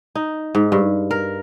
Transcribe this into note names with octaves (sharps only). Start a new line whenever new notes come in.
D#4
G#2
G2
A#4